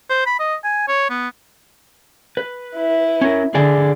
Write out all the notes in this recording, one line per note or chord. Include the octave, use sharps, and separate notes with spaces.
C5
B5
D#5
G#5
C#5
B3
B4
E4
C#4 A#4
D3 G#4 D5 G#5